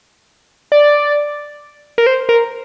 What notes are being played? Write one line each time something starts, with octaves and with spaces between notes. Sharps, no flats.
D5
A#4
C5
A#4